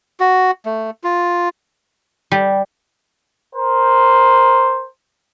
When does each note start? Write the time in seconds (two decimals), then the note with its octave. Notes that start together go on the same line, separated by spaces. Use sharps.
0.20 F#4
0.66 A3
1.04 F4
2.31 G3
3.55 A#4 C5